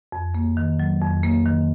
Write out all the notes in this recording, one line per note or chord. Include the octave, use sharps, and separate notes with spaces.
F2
A#3
D#3
F#3
F2
A#3
D#3